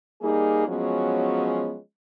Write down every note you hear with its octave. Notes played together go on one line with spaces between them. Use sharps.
G3 A#3 D#4 G#4
F3 F#3 G#3 B3 C#4